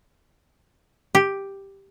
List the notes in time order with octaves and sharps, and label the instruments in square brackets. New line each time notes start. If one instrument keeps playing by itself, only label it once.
[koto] G4